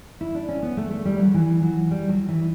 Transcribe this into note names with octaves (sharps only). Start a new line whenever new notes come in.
E4
D4
C#4
B3
A3
A3
G3
F#3
E3
F#3
G3
F#3
E3